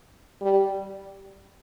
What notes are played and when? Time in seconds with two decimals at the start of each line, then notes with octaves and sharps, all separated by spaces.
0.41 G3